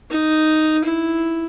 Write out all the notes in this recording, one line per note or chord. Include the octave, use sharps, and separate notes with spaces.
D#4
E4